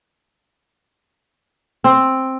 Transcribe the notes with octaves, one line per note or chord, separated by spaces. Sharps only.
C4